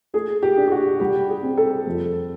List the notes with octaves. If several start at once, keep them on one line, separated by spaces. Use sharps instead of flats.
A3 G#4
G4
D4
G4
F#4
G3 G4
G#4
C4
A4
F2